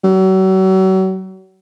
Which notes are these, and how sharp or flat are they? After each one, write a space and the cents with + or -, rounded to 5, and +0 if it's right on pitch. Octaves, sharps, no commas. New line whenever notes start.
F#3 +40